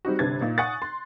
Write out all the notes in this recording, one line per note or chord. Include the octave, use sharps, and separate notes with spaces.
G3 C4 D#4 F#4
G1 C3 D4 B4 G#6 A6
A#2 D#4
F#5 G#5 C#6 D#6 F#6 A6
C6